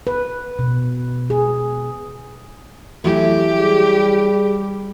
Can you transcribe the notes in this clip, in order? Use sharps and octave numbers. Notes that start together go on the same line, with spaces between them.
B4
B2
G#4
E3 F#3 A3 E4 G4
G3 G#4 D6